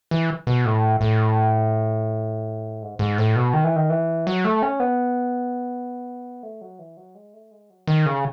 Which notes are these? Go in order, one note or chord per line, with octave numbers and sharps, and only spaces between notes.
E3
B2
A2
A2
G#2
G#2
A2
B2
D#3
E3
D#3
E3
F#3
A3
C#4
B3
A3
F#3
E3
F#3
G#3
A3
G#3
F#3
D#3
C#3